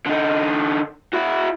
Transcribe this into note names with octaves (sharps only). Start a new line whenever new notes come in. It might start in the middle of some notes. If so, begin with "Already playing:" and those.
D3 D#4
E4 F#4